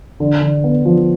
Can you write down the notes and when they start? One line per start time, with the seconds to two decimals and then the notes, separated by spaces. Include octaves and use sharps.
0.20 D3
0.41 D3
0.64 B3
0.85 F3